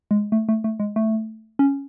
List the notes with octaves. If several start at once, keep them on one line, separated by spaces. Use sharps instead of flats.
G#3
A3
A3
A3
G#3
A3
C#4